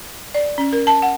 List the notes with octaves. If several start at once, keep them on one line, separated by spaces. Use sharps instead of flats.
D5
C#4
A#4
A5
F#5